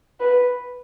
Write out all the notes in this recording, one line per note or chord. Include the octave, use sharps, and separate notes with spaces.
B4